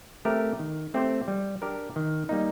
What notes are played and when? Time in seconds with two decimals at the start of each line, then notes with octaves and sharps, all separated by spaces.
0.25 A3 C4 G4 A#4
0.59 D#3
0.94 A3 C4 G4 C5
1.28 G3
1.62 D4 G4 A#4
1.96 D#3
2.29 G3 A#3 D#4